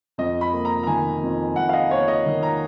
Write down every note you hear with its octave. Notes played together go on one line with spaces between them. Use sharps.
F2 D#5
B5
A#3
A#5
A#5
D#3 G#5
F2
F2 F#5
F5
D#5
A#3 C#5
D#5
D#3
A#5